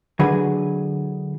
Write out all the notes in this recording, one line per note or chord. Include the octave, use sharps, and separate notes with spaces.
D3 F#3 F#4 G#4 B4